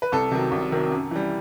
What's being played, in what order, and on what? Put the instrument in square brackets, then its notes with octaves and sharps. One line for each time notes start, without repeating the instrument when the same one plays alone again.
[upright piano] B4
C2 A4
C3 D#3 F#3
C2
C3 D#3 F#3
F#2
E3 G3